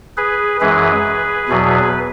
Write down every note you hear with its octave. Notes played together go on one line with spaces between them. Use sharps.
G#4 B4
F#2 E3 G#3 G#4 B4
E2 B2 F#3